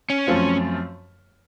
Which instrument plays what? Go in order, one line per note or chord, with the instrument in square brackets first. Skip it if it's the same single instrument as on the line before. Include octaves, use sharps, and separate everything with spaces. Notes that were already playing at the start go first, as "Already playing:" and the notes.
[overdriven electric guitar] C#4
[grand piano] F#2 F3 A3 C4 F4